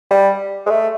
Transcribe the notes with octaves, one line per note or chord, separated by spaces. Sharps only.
G3
G#3
A3